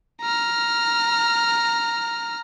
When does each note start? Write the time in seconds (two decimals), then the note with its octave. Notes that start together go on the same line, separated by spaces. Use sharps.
0.22 A#5 F6